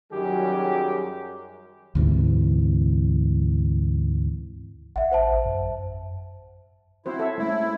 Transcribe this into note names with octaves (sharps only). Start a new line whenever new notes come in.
F#2 D#3 F#3 G3 G4 G#4
D2 G#2 C3 E3
A1 E5 F#5
C5 E5 A5
F#2
C4 E4 F#4 C5
A4 C#5 E5
G#3 A3 C#4 E4